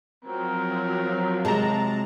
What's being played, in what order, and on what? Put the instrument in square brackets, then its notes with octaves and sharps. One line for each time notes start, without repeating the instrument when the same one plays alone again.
[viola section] F3 F#3 C4 [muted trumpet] A#4
[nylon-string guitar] C3 G#3 [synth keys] A5 A#5